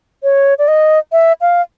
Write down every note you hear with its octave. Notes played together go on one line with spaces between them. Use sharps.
C#5
D5
D#5
E5
F5